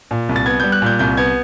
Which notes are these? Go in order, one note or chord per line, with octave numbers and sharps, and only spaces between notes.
A#2
C2
A6
B3 G#6
G3 G6
F#6
A#2 G6
C2 G6
B3 G#6